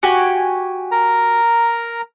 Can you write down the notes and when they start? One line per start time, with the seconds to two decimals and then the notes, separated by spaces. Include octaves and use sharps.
0.03 F#4 G4 G#5
0.91 A#4 A#5